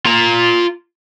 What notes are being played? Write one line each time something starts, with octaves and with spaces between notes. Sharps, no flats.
F4 A#5